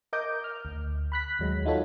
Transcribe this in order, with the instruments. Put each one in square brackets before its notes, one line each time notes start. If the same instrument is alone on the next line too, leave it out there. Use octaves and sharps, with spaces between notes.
[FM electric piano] A#4 D#5 D6 D#6 G6
F6
D2
B5 F#6 B6
D#2 F#3 G#3
D#4 F4 F#4 A4 C#5